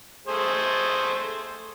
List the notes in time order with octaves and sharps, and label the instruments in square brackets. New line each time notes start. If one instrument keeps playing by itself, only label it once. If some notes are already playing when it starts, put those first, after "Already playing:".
[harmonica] A3 G#4 C5